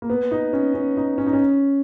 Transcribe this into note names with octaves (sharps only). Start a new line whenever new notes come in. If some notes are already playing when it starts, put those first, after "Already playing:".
A#3
B3
D#4
C#4
C#4
D#4
C#4
D#4
C#4